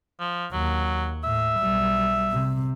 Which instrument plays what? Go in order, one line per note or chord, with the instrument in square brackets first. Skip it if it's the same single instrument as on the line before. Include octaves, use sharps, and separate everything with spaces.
[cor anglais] F3
[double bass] D#2 [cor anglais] F#3
[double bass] A2 [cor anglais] E5
[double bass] B1 G3
C3